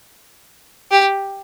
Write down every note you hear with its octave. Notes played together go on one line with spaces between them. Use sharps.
G4